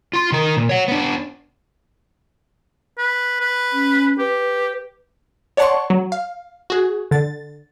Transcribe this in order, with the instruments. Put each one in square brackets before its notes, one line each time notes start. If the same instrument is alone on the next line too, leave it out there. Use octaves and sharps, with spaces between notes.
[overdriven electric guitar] F4 C6
D#3 A#4
A#2
C#5 F#5
B3 D4
[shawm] B4
B4
[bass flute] C#4
[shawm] G4 [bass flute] B4
[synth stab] C#5 D5 F#5 A5 C6 C#6
F#3
F5
F#4 G#4
D3 A6